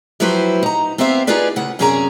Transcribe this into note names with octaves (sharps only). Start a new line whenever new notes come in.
F3 F#3 E4 G4 B4 C5
D#4 A#5
B3 C4 G4 C5 E5 F5
D#4 F4 G4 G#4 B4 D5
D2 C#3 F#5
F#2 C3 C#4 G#4 D5 A#5